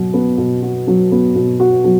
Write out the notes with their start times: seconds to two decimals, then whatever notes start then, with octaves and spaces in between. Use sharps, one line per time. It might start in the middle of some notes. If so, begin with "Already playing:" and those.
Already playing: B2 F#3 F#4
0.14 B3
0.38 B2
0.62 F#4
0.87 F#3
1.12 B3
1.35 B2
1.60 F#4
1.84 F#3